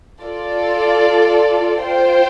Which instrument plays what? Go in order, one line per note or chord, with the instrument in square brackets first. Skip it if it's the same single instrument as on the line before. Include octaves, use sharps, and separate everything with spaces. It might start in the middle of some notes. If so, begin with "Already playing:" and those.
[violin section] F4 A4 D5
F4 C5 G5